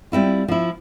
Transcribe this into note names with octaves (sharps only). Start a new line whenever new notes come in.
G3 C4 E4 F4
F3 E4